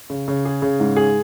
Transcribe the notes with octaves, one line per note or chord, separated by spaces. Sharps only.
C#3
C#3
G#4
C#3
G#2
G#4